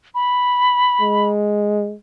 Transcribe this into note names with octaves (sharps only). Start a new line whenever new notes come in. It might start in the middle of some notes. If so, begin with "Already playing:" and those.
B5
G#3